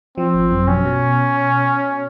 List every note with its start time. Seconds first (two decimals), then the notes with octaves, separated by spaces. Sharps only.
0.18 F3 C4
0.34 G#1
0.51 F#2
0.68 B2 C#4
0.85 B2